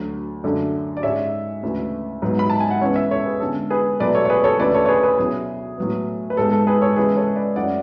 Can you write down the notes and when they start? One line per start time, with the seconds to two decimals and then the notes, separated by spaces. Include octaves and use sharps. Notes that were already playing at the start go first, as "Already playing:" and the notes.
Already playing: D2 D3 F#3
0.44 F#2 D3 A3 D4
0.97 D5
1.03 G#2 G#3 C#4 C#5 E5
1.63 D2 C#3 E3 A3
2.22 G#2 F#3 B3
2.39 B5
2.50 A5
2.60 G#5
2.71 F#5
2.81 C#2 C#3 E3 B3 C#5 E5
2.96 C#5 E5
3.10 A4 C#5
3.25 G#4 B4
3.40 E2 D3 G#3 C#4 A4
3.70 G#4 B4
4.00 E2 B2 F#3 A3 B4 D5
4.15 A4 C#5
4.25 C#5
4.30 G#4 B4
4.44 A4 C#5
4.59 D2 C#3 E3 B4 D5
4.74 A4 C#5
4.85 C#5
4.89 G#4 B4
5.03 G#4 B4
5.18 B2 F#3 C#4 E4 G#4
5.78 A2 F#3 B3
6.30 B4
6.37 G#2 G#3 B3 A4
6.52 A4
6.67 G#4 B4
6.81 A4 C#5
6.96 C#3 E3 G#3 B3 G#4 B4
7.17 A4 C#5
7.36 B4 D5
7.56 F#2 E3 A3 C#4 E4 D5 F#5